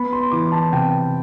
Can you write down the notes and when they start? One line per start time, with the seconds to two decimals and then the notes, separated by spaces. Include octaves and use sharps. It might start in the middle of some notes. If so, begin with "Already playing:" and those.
Already playing: B3 B5
0.13 C6
0.32 E3 D6
0.52 A5
0.72 C3 G5